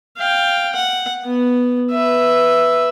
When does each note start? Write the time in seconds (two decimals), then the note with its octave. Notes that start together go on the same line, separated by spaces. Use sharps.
0.18 F5 G5
0.74 F#5
1.25 B3
1.91 B4 E5